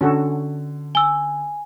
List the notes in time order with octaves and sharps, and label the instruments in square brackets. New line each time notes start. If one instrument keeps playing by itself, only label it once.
[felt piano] D3 [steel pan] C#4 F#4 A4
[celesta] G#5 [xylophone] E6 G7